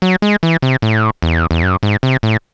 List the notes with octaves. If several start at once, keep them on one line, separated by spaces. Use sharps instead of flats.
F#3
G#3
E3
C3
A2
E2
E2
F#2
G#2
C3
A2